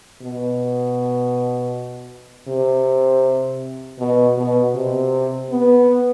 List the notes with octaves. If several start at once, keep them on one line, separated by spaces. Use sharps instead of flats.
B2
C3
B2
B2
C3
B3